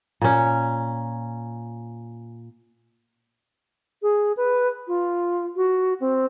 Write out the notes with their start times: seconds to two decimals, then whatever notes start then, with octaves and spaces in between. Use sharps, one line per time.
0.21 A#2 C#4
4.02 G#4
4.36 B4
4.87 F4
5.56 F#4
6.00 C4